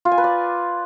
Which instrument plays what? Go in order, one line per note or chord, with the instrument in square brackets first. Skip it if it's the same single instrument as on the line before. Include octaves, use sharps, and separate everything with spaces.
[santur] F4
G#5
B4
D5